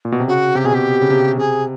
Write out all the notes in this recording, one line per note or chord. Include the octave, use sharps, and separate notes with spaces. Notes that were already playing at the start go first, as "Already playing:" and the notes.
A#2
B2
C3
C#3 F#4
C3 G4
B2 G#4
C3 G4
C#3
C3
C3 G#4